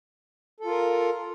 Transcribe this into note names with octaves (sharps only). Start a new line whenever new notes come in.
F4 A4 A#4